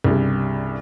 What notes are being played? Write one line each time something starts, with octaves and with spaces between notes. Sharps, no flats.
C2 G2 C#3